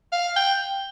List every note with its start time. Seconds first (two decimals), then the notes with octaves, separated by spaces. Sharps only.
0.12 F5
0.36 G5